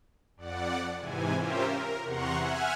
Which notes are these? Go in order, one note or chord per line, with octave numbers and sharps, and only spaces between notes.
F2 D5 F#5
G#2 C3 E3 G#5
C#4 F4 G4 A#4 C5 E5
A#4
E2 C3 F#5 A#5 C6 C#6
E5 F#5 G#5 F6 F#6 G#6